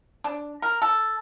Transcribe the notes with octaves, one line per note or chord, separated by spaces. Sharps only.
D4
A#4
A4